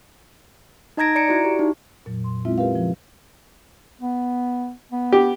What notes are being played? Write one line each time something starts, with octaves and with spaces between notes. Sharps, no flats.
D#4 D#5 A#5 G#6 A#6 D7
D5 A#5 C#7 D7
E4 F#4 D5
G4
D#4
F2 A#2 F#3
C6
G#3 C4 C#4 E4 F4 E5
G4 A#4 B4 F5
C#3 F3
B3
B3
G4